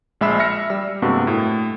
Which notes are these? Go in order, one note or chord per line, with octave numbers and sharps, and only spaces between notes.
A#1 G#3 E5 B5 E6 C7
E5 F6 A#6 C#7
G3 E6
G2 C3 G#3 A#3 B3 F#4
A2